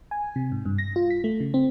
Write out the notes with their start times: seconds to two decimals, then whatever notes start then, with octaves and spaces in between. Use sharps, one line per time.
0.11 G#5
0.36 C3
0.52 G#2
0.65 G2
0.78 A#6
0.96 F4
1.10 B6
1.24 A3
1.40 C#3
1.54 C4